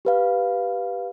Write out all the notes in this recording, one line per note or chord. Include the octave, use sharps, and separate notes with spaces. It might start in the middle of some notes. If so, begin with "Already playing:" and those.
G4 B4 F5